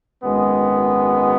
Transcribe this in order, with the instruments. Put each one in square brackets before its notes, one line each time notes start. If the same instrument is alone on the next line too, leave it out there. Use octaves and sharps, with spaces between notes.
[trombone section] G#1 F#2 D#3 G#3 B3